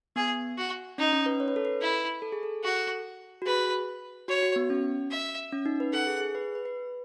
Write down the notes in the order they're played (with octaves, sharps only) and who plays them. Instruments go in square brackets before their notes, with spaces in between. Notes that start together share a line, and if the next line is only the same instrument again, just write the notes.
[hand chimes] B3 [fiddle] G#4
[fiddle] F#4
[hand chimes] C#4 [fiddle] D#4
[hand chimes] C#4
B4
C#5
B4
A4
B4
[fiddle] E4
[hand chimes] A4
G#4
A4
[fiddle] F#4 [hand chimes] A4
[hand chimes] F#4
[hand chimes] G#4 [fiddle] B4
[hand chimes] F#4 [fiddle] C#5
[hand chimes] F#4
B3
C#4
[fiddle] E5
[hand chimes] C#4
D#4
B4
[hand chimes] A4 [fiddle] F#5
[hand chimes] G#4
G#4
B4
B4
B4